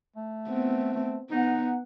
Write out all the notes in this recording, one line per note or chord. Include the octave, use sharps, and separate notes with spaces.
A3
B3 C4
A3
B3 D#4 F#5